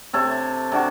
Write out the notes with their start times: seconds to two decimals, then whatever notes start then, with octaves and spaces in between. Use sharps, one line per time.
0.13 C3 A4 C#5
0.72 C3 D4 F#4